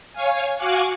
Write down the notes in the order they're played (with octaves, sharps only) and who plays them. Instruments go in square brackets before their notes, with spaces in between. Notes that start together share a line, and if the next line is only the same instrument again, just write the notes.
[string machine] C#5 F5 G#5
F#4 F5 G#5 C#6 D6 F#6